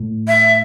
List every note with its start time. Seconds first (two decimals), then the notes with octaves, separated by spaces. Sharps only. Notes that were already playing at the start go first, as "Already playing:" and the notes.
Already playing: A2
0.28 E5